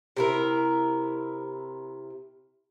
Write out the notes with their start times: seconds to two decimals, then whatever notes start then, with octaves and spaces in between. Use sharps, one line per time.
0.17 C3 E4 A#4